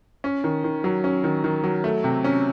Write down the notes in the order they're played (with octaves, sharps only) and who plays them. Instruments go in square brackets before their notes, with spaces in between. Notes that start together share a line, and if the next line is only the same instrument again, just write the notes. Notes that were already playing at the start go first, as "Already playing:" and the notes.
[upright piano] C#4
D#3
D#3
F#3
C#4
D#3
D#3
F#3
A3
C3
C#4